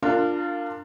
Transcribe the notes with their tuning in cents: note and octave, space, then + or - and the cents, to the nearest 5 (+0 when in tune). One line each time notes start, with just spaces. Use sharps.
D4 +10 F4 +0 A#4 -25